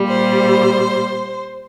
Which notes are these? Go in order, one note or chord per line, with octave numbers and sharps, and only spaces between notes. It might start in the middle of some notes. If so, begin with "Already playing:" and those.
Already playing: A#2 G3
C5